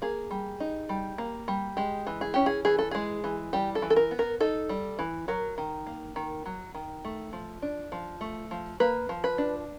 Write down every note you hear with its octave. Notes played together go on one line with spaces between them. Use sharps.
A#3 G#4
G3
D#4
G3
A#3
G3
G#3 G4
E3
G#4
C#4 G4
G#4
E3 G#4
A4
G#3 G#4
E3
G3 G4
A4
E3
A4
A#4
B3
A#4
D#4 A4
G3
E3
F#3 A#4
D#3
A#3
D#3
F#3
D#3
A3
F3
D4
F3
A3
F3
A#3 B4
F3
B4
D4